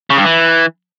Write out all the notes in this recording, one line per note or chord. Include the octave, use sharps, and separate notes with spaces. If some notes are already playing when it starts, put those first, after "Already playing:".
C#3
G2
E3